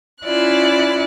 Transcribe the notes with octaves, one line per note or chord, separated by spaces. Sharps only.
C#4 E4 F4 D5 F#6